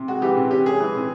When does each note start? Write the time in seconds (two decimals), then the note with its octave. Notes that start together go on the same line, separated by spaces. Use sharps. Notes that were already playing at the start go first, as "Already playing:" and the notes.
Already playing: C3
0.08 G#3 F#4
0.22 E3 G4
0.37 C3
0.51 C#4 G4
0.65 G#3 G#4
0.80 E3
0.95 C3